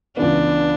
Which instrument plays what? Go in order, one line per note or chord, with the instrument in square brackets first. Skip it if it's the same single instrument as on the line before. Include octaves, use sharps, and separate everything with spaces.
[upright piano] C#2 C#3 E3 B3 [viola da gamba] D4